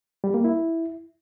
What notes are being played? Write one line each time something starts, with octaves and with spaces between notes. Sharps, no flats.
G3
A#3
E4